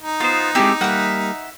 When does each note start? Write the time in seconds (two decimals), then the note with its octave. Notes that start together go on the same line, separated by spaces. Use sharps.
0.01 D#4
0.20 B3 F4 C5
0.55 G#3 A3 C4 E4 G4
0.81 G3 A#3 E5 F#5